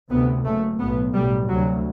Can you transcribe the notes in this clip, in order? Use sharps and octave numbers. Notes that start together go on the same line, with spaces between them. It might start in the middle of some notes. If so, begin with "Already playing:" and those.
D2 C3 B3
F#1 F#2 A3
B1 A2 B3
B1 A2 G3
D2 C3 F#3